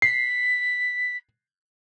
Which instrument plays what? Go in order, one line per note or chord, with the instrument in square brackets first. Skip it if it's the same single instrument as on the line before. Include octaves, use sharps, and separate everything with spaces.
[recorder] B6 [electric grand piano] C7